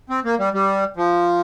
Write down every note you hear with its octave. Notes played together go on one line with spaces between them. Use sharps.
C4
A#3
G3
G3
F3